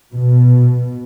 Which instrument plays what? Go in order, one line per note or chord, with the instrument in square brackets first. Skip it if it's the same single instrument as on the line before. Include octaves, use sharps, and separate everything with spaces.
[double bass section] B2